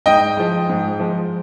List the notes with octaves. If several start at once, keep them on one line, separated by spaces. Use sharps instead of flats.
G#2 D#5 G5
F3 G#3
G#2
F3 G#3